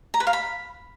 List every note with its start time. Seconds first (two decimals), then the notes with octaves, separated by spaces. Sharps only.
0.14 A#5
0.20 B4
0.27 F5
0.33 B5